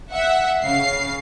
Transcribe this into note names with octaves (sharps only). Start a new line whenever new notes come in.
E5 F#5
C#3 F5 C7